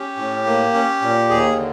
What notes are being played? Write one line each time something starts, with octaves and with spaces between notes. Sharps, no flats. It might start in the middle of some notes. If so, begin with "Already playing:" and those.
Already playing: C#4 G4
A2
A#3
C#4
A#2
D#2 G#4
D3